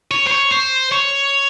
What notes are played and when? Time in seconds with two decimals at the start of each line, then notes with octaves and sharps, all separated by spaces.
0.11 C#5
0.27 C5
0.32 C#5
0.52 C5
0.92 C#5